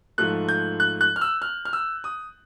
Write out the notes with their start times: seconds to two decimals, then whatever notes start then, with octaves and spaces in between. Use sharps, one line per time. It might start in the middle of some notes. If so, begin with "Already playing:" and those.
0.18 G#2 F3 A3 F#6
0.48 G6
0.80 F#6
1.01 F#6
1.16 F6
1.21 E6
1.42 F6
1.65 F6
1.73 E6
2.04 D#6